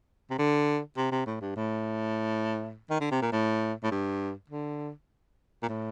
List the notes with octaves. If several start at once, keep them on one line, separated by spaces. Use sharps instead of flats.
C3
D3
C3
C3
A2
G2
A2
D#3
D3
C3
A#2
A2
A2
G2
D3
A#2
A2